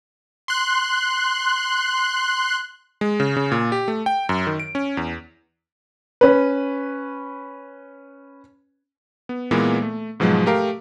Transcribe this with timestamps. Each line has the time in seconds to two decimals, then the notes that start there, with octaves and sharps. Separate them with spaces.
0.48 C6 F#6
3.01 G#3
3.20 C#3
3.36 C#3
3.52 A#2
3.72 G4
3.88 A3
4.06 G5
4.29 F#2
4.47 D#3
4.60 D7
4.75 C#4
4.97 E2
6.21 C#4 B4
9.29 B3
9.51 A#2 E3 G#3 A#3 B3
9.82 A3
10.20 G#2 B2 F3 F#3 G#3
10.46 A3 G4 A#4 F5